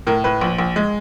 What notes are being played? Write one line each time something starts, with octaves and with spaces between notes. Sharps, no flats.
A2 A#4
A2 B4
A#1
A#1
G#3